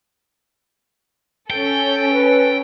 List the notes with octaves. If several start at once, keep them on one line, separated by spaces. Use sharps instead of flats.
C#4 A4 G5
B4